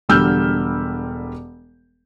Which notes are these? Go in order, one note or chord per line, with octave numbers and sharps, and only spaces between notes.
E1 D3 G3 E6 F6 G6